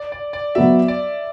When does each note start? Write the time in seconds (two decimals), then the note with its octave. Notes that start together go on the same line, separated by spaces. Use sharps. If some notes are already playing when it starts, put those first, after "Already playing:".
Already playing: D5
0.12 D5
0.33 D5
0.55 F#3 B3 F#4 E5
0.88 D5